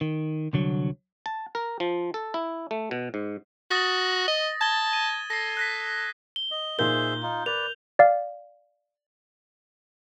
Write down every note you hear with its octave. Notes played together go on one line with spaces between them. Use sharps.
D#3
C2 D3 F#3
A5
A#4
F3
A4
E4
A3
B2
G#2
F#4 D#6 A6 A#6
D#5
A5 G#6 G7
D#7
A4 A#6 C7
F#6 A#6 B6
G7
D#5
A#2 D#4 G#4 A#4 C5 E5 G6 G7
D#4 F4
A#4 B4 D5 F7
D5 F5